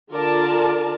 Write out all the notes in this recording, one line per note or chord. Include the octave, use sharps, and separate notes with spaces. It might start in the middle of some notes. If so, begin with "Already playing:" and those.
D3 F4 A#4 D5 A5